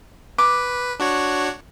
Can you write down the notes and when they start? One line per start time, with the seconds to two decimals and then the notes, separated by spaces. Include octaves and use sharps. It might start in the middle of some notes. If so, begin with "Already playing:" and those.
0.38 B4 D6
1.00 D4 F#4 C#5